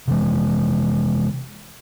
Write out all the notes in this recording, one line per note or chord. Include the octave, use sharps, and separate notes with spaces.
C3 E3 G#3